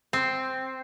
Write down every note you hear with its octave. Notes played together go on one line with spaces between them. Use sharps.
C4